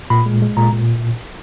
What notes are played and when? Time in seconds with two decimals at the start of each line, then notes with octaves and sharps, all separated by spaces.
0.10 A#2 B5
0.26 G#3
0.42 G#3
0.57 A#2 A#5
0.72 A#2